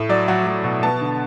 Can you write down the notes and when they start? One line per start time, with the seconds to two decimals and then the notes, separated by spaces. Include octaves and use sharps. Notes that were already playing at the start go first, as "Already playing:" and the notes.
Already playing: A2
0.09 F#3 D5
0.28 F#3 F#5
0.47 F#3
0.64 B2
0.83 B3 A5
1.01 D3